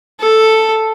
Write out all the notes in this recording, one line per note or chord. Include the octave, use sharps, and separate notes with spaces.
A4